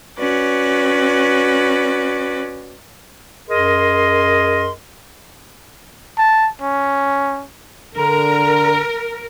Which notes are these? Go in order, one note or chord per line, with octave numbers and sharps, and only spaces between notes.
C#4 F#4 B4 D5
F#2 G#4 A#4 D#5 C6
A5
C#4
D3 A#4 A#5